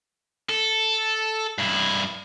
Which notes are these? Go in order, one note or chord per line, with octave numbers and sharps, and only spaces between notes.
A4
G2 E4